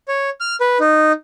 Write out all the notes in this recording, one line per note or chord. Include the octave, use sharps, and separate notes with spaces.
C#5
F6
B4
D#4